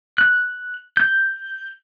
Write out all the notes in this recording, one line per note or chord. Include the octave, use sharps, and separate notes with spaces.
F#6
G6